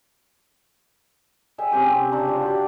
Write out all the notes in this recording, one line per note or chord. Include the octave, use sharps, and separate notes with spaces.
G#4 E5 G5
C3 C#4 G4 E5
C4
C#3 D4 C#5 A#5
F3 D5
F#4 G4